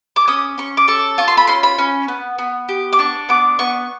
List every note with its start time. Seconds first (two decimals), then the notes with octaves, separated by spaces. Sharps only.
0.16 D6
0.28 C#4 D#6
0.58 C#4 C#6
0.77 D6
0.88 A4 C#6
1.18 F4 C#6
1.28 C6
1.37 B5
1.47 C#4 C6
1.63 B5
1.78 C#4
2.08 B3
2.38 B3
2.69 G4
2.93 D6
2.99 D4 C#6
3.29 B3 D6
3.59 B3 C#6